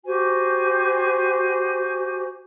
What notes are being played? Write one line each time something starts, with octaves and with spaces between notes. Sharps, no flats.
F#4 G4 C5 G#5